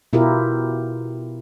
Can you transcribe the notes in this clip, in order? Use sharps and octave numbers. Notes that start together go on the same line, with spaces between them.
B2 E4 F4 G4 A#4